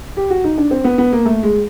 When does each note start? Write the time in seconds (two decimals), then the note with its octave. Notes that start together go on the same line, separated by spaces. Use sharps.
0.17 G4
0.30 F#4
0.44 D#4
0.58 D4
0.71 C4
0.84 B3
0.98 B3
1.13 A#3
1.25 A3
1.43 G#3